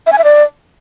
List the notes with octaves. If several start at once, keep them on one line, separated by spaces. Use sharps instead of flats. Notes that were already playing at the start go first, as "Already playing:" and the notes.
E5
G#5
E5
D5